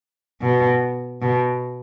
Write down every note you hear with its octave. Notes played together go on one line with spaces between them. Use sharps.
B2
B2